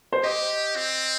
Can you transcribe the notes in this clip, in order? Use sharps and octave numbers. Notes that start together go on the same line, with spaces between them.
C5
G4 D#5
C4